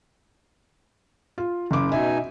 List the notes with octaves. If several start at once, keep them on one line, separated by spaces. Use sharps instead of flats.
F4
F#1 D6
B2 D#4 E5 G#5